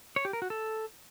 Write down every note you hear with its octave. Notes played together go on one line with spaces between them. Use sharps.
C#5
G4
A#4
F#4
A4